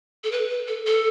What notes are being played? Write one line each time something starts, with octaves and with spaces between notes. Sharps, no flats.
A4
B4
B4
A4
A4